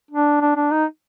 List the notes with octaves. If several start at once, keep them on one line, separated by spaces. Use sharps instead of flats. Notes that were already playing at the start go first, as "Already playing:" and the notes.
D4
D4
D4
D#4